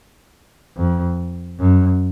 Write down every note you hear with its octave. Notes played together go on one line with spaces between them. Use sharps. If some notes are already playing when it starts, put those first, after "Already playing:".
F2
F#2